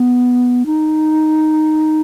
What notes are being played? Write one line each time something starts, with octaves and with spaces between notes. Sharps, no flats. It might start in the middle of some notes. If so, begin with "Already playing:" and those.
Already playing: B3
D#4